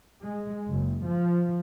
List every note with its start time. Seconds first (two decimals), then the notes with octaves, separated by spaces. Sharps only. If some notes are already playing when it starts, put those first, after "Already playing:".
0.23 G#3
0.69 F#1
1.05 F3